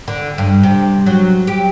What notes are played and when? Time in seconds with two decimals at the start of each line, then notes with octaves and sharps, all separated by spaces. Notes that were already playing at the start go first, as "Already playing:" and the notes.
0.08 D3
0.38 G2
0.63 C3
1.06 F#3
1.47 G4